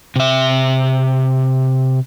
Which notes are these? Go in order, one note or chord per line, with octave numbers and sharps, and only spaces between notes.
C3 E5